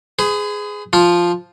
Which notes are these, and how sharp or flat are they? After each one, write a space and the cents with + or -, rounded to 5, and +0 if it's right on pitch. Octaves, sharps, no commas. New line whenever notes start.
G#4 +0 B4 +45
F3 +0 F4 +0